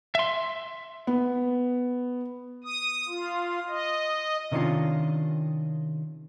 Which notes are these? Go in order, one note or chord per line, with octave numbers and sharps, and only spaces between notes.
E5 C6
B3
D#6
F4
D#5
C3 D#3 C#4 D4 F4